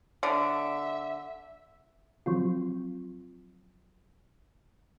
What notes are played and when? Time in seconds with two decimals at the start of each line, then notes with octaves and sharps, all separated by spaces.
0.23 D3 E5
2.26 F3 F#3 C4 F4